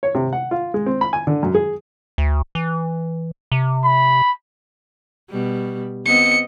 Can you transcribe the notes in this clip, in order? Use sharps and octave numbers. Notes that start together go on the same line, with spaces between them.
C#5
C3
F#5
F4
G#3
C4
B5
G#5
D3
F#2
G#4
D2
E3
C3
B5
B2 G3
B3 C4 D#5 C#7